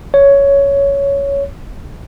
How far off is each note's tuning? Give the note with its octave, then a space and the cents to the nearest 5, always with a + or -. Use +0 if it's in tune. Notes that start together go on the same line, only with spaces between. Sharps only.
C#5 +10